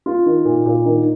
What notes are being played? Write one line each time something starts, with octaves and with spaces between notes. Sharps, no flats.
F4
D#3
A#2
A#2
D#3